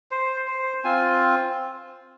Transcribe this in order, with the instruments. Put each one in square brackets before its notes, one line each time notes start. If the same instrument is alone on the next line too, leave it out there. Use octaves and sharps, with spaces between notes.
[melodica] C5
C5
C4 F4 G#5